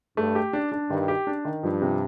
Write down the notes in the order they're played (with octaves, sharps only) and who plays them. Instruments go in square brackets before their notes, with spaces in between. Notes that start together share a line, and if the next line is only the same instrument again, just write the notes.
[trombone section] G2 [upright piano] A3
[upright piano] G4
D4
D4
[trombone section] G2 [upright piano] D#3
[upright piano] G4
D4
D#3
[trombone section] G2 [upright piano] F3
[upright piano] C3